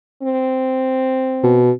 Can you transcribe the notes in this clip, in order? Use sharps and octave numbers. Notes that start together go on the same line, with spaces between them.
C4
B2